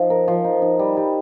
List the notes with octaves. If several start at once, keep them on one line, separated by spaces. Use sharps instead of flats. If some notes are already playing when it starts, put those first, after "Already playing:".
Already playing: F3 D#4
A#4
F3
D#4
D#4
G3
G3